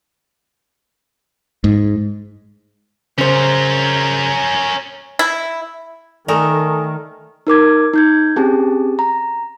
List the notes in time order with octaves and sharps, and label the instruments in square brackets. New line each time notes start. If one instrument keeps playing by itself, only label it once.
[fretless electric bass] G#2
[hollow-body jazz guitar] C#3 C5 [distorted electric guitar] C#4 A#4
[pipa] E4
[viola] D#3 [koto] A3 A#4 [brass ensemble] A4 [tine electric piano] D5 G#5 D#6
[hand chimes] D#4 A#4 D6 G#6
D#4 G6 G#6
C4 C#4 G4 G#4 A5
A#5